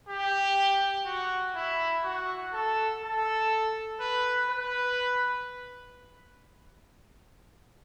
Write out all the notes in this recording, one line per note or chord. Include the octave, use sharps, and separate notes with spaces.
G4
F#4
E4
F#4
A4
A4
B4
B4